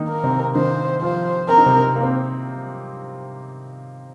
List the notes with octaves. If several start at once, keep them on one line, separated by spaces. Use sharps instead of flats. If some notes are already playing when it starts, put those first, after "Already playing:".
Already playing: D#3 A#3 D#4
A#4
C3 C4
D#3 D#4 C5
F3 F4 C5
C4 A#4
D#4
C3 C4
A#3
C4